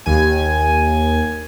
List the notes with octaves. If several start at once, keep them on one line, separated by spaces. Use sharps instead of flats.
D#2 G#5